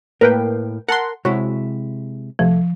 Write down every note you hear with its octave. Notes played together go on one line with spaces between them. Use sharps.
A2 A#3 A#4 B4 G5
A#4 F#5 A5 C6
C3 G#3 E4 F#4 C#5
C2 F3 A3